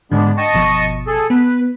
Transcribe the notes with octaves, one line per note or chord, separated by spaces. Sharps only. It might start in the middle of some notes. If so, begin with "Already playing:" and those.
G#2 D3 G#3 B3 D4
D#5 G5 A5 C#6
G1 B2 F3
G#4 A4
B3 B4